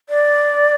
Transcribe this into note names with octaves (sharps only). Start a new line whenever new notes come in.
D5